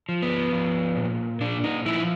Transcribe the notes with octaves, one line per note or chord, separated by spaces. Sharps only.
F3
B3
F3
A#2
A#2 D4
D#4
F3 E4